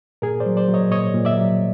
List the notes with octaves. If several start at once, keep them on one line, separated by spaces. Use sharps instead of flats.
A#2 G#4 A#4
C5 D5
F#3
C5 D5
F#3
C#5 D#5
A#2 C#5 D#5
A#2
D5 E5
F#3